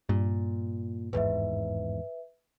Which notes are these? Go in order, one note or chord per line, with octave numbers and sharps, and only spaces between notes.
G2 A#2
G#1 E2 G#2 B4 E5